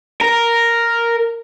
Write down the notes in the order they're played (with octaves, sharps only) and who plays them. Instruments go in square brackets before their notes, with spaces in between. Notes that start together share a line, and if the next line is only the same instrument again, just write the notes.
[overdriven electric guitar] A#4